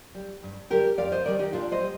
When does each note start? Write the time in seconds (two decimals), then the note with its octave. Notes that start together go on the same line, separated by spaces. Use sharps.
0.15 G3
0.43 G2
0.70 D3 G3 G4 A#4
0.98 F2 D5 F5
1.12 C5 D#5
1.25 D#3 G3 A#4 D5
1.39 D#4 G4
1.53 A#2 D4 F4
1.72 C5 D#5
1.81 G3